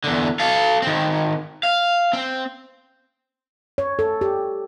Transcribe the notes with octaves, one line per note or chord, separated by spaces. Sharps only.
E2 D3
A4 F5
D#3 C4
F5
C4
C#5
A4
G4